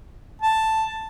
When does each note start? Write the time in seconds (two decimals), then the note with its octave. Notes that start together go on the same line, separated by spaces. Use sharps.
0.42 A5